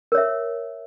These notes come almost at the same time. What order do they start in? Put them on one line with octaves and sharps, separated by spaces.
A#4 C#5 E5